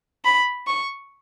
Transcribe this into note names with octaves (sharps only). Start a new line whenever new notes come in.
B5
C#6